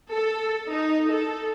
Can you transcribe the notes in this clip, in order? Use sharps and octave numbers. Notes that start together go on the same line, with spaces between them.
A4
D#4
A4